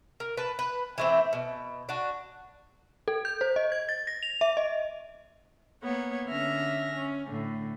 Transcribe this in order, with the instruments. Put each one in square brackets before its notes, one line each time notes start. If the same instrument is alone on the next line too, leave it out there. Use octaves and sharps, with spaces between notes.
[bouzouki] A#4
B4 A5
B4
E3 A3 C4
B2
D4 F#4
[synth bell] A4
G6
C5
D#5
G#6
A6
A#6
F7
E5
D#5
[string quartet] A#3 B3 C#5 F#5
D3 C#4 E5 F6 A#6
C#4
A2 D3